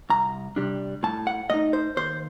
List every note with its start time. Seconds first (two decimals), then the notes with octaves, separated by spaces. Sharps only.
0.10 C2 A#5
0.56 C3 G3 D4
1.03 A2 A5
1.27 F#5
1.50 A3 D#4 D#5
1.73 C5
1.97 D#2 C5